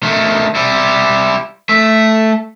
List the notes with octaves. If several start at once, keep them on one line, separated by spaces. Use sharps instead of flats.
D#3 A3
G3 E4
A3 E5